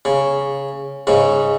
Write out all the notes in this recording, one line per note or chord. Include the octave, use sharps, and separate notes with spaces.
C#3
G#2 C#3